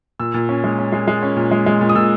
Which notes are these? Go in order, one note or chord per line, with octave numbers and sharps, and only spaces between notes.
A#2 E6
A#2
C#4
G#3
C#4
G#3
G#3
C#4
A#2
G#3
G#3
A#2
D#6
A#2 E6